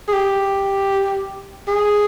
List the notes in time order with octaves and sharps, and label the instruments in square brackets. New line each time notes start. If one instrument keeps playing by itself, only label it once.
[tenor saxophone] G#4
G4
G#4